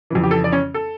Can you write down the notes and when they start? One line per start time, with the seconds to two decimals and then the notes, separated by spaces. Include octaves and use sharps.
0.11 F2 C#3 E3
0.23 G4
0.31 A4
0.44 D5
0.52 C#4 C#5
0.74 A4